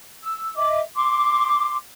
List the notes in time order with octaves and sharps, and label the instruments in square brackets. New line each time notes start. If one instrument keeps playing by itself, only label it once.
[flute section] E6
D#5 E5 D6
C6 D6